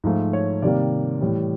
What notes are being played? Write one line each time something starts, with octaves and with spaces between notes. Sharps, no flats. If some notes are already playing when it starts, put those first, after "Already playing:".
G#2 F3 A3
C#5
C3 D#3 G3 A#3 D5
A2 E3 G3